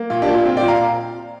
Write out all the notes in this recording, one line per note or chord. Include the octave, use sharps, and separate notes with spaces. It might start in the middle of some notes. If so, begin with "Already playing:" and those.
Already playing: A#3
A#2 F4
D4 G4
A#2
F4
C4 F4
D5 G5
A#2
F5 A#5